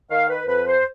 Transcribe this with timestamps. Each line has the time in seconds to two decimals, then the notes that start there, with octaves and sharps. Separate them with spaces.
0.10 D#3 F5
0.29 B4
0.47 F2 B4
0.66 C5